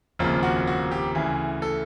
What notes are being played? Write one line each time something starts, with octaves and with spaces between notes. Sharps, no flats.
F1 D#2 C#3 F3 A#3
F#4
F#4
G4
D2 C#3 E3 G#4
A4